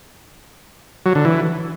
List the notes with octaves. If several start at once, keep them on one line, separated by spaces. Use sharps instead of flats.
F#3
D3
E3